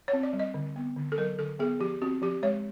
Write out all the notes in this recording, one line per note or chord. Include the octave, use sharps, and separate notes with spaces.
C#5
C4
D5
G3
D#5
D3
B3
D3
A4
F#3 A#4
D3 A4
B3 G#4
F3 G4
C4 F#4
F3 G4
G#3 C#5